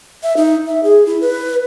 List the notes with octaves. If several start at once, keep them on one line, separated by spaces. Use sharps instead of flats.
E5
D#4
E5
G#4
E4
B4